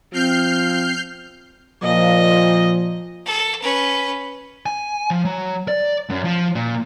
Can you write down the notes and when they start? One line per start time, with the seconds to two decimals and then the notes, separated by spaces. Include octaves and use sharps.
0.13 F3 C4 F6 G6 C7
1.83 A#2 F3 D#5
3.26 A4
3.62 C#4 B4
4.66 G#5
5.10 F3
5.25 F#3
5.68 D5
6.09 F#2
6.24 F3
6.55 A#2